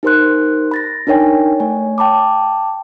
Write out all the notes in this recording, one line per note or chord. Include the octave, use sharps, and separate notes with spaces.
D#4 G4 A#4 C5 C6 F#6
B5 A6 A#6
D4 D#4 A#4 C#5 G5 G#5
A3 C#5 G#5
G5 A5 B5 D6